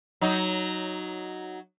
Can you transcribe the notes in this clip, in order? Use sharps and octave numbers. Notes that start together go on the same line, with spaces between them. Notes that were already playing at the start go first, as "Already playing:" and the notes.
F#3 D#4